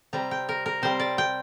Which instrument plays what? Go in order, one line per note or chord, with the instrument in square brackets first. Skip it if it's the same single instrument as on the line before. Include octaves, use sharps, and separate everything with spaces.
[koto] C3 G3 C4 A#5
G5
A#4
A#4
C3 G3 C4 C5
D5
G5